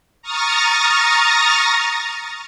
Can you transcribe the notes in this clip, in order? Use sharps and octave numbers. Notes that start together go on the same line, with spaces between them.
A#5 C#6 D#6 F6 A6 A#6